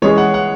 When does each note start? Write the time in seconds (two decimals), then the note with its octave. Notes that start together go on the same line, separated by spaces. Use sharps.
0.02 E3 G#3 C#4 G#4 C#5
0.18 F#5
0.34 F#5